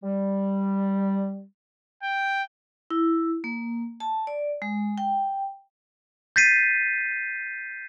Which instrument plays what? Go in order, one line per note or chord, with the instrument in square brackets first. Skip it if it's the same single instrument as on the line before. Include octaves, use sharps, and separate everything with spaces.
[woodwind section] G3
[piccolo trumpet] G5
[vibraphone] E4
A#3
A5
D5
G#3
G5
[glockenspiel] G6 A6 B6 C7 D#7